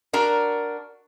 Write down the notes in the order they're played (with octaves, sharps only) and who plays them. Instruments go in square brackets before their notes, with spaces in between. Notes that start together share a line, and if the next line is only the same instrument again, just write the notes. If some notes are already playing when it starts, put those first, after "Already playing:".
[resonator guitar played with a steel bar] D4 F#4 A#4